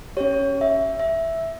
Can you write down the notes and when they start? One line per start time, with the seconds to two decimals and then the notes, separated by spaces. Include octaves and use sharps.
0.17 C#4 G4 C#5
0.61 E5
1.00 E5